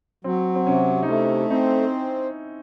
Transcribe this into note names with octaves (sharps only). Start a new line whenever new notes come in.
F#3 C4
C4
C3 C#4
D#4
A3 E4
C4 D#4